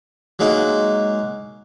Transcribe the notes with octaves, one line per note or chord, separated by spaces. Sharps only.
F#3 G#3 A#3 D#4